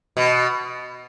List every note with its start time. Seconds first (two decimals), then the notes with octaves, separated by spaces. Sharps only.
0.17 B2